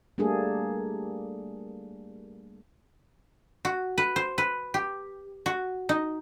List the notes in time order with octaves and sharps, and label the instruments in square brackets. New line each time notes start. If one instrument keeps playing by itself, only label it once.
[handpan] G3 A3 A#3 D4 G#4 A4
[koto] F#4
B4
C5
B4
G4
F#4
D#4